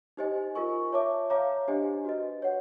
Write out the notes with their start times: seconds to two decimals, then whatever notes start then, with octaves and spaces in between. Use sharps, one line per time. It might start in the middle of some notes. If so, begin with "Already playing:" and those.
0.17 D#4 G4 C5 D#5 G#5
0.55 F4 A#4 D#5 G#5 C#6
0.93 C#5 E5 A5 D6
1.30 C#5 F5 A#5 D6
1.68 D4 G4 C5 D#5 G#5
2.05 F#4 B4 D#5
2.42 C#5 F#5